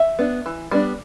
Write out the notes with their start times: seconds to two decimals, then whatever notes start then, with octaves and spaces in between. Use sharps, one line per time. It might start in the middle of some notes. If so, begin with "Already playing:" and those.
Already playing: E5
0.19 B3 D4
0.46 E3
0.71 G3 B3 D4